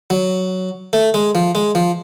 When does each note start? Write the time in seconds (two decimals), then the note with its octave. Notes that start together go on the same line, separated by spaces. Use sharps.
0.10 F#3
0.93 A3
1.14 G#3
1.35 F3
1.55 G#3
1.75 F3